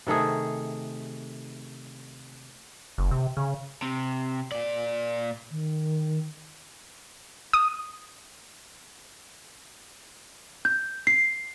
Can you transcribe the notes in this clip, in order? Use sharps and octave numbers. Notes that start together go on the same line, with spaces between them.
C3 D#3 A3 G#4
F#1
C3
C#3
C3
A#2 D5
D#3
D#6
G6
C7